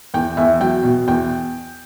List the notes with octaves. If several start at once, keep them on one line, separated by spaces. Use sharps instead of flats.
E2 G5
E2 E5
F#3 G5
B2
E2 G5